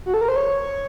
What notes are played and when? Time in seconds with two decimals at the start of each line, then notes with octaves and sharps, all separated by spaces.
0.06 F#4
0.14 A4
0.21 A#4
0.28 C5
0.36 C#5